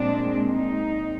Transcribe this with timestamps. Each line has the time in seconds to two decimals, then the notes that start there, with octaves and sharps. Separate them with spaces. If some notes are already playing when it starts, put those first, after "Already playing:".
Already playing: A#2 G#3 C4 D4
0.52 D#4